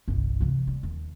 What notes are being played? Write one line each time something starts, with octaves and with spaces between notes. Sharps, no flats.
G1 C2
C3 E3
G3
D#2